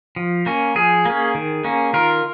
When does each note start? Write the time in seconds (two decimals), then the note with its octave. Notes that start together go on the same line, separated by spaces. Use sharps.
0.16 F3
0.46 A#3 C#4
0.75 F3 G#4
1.05 A#3 C#4
1.35 D#3
1.64 A#3 C#4
1.93 D#3 F4 A#4